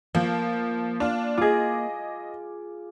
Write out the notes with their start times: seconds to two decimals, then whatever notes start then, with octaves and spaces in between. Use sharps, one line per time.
0.15 F3 A#3
1.00 D4 F4
1.38 F4 G#4 D#5 D6